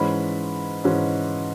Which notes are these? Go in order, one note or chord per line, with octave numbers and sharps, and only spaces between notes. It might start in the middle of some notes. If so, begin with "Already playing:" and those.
Already playing: G#2 E3 G#3 C#4 B5
G#2 E3 G#3 C#4